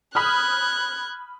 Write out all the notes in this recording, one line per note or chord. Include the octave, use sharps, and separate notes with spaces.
B5 D#6 F6 F#6 G#6